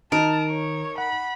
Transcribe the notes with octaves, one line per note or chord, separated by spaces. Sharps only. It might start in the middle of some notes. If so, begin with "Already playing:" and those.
D#3 D#4 A#4 A5
C#5
F#5 B5